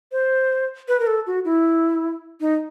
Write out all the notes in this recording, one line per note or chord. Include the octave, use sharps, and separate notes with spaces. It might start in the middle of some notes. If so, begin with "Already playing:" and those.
C5
B4
A#4
A4
F#4
E4
D#4